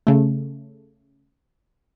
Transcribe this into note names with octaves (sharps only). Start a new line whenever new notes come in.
C#3 A3